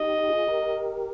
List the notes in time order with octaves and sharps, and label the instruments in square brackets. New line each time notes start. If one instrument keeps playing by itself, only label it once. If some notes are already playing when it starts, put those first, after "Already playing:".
Already playing: [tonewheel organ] D#4 G4 [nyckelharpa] D#5
[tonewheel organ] F4 G#4
G4 A#4